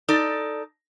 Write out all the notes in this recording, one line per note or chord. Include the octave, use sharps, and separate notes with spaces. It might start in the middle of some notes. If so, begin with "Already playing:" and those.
D#4 A4 D5